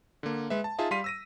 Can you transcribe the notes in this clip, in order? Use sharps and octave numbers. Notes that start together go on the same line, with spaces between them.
D3 A#3
G#3 B4 E5
A5
D#4 F4 G#4 E5 A5
G3 F5 C6 B6 D#7
E6 A#6 D#7